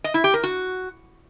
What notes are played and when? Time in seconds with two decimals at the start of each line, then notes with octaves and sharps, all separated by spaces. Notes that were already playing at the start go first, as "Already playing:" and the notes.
0.04 D#5
0.14 E4
0.24 G4
0.34 A#4
0.43 F#4